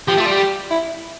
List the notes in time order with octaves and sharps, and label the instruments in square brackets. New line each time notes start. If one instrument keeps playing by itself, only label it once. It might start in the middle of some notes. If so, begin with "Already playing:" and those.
[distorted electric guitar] F3 [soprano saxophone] G4
[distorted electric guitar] A3 [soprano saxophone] F4
[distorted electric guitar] G3
[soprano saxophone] G4
E4